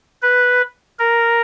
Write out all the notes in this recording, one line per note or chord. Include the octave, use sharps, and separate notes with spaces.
B4
A#4